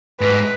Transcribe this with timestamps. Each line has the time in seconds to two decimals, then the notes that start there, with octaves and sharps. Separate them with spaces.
0.21 G#2 B4